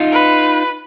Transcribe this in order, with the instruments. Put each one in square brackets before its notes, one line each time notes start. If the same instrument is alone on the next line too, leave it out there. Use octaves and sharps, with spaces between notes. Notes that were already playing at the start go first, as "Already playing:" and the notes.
Already playing: [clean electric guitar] D#4 F4
[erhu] B4